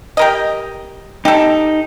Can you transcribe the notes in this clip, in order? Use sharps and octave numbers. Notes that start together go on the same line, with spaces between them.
G4 A#4 D#5
D#4 G4 A4